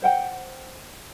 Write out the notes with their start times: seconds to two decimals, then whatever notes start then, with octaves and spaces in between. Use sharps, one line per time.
0.02 C5 F#5 G5